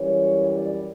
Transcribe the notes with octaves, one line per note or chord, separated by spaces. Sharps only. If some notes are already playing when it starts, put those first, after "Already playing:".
Already playing: F#2 E3 G3 C#5
D5